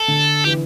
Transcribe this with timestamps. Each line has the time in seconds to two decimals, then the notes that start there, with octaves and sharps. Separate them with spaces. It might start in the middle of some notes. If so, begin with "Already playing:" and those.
Already playing: A4
0.08 D3
0.44 E3 G4